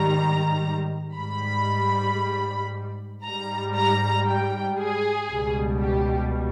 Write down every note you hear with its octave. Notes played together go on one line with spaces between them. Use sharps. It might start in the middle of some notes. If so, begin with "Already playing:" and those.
Already playing: G#2 D#3 G3 A#5
G#2 G3 B5
G#2 G3 A#5
A#5
G5
G#4
C#2 B2 G3
G4